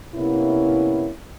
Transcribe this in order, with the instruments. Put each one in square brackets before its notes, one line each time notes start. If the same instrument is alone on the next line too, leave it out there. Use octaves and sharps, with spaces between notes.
[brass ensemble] C3 A#3 B3 C#4 E4